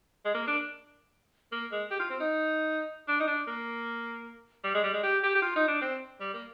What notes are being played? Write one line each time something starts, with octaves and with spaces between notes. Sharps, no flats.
G#3
A#3
D4
A#3
G#3
G4
F4
C4
D#4
D4
D#4
D4
A#3
G3
G#3
G3
G#3
G4
G4
G4
F4
D#4
D4
C4
G3
A#3